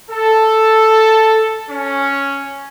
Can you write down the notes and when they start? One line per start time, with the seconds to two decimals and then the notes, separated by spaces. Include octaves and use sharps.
0.11 A4
1.71 C#4